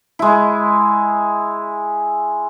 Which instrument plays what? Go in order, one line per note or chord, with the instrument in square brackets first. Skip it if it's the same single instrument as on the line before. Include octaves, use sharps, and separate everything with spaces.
[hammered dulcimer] G#3 E4